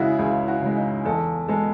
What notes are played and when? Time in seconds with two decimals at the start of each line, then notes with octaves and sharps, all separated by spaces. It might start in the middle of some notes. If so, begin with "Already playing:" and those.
Already playing: C#3 G#3 E4 F#4 G#4
0.19 C#2 G#4
0.48 F#4
0.62 C#3 G#3
0.76 D#4
1.05 E2 A4
1.48 B2 G#3 B3 A4